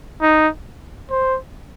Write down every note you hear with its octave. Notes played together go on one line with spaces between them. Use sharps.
D#4
C5